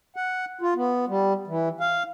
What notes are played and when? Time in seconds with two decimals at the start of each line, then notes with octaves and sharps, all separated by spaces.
0.16 F#5
0.61 F4
0.76 B3
1.08 G3
1.47 E3
1.80 F5